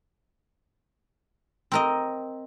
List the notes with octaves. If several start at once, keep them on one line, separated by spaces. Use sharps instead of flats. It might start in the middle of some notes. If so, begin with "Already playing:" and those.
C4 A#4 D#5